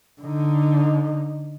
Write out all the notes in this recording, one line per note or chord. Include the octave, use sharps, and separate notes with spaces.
D3 D#4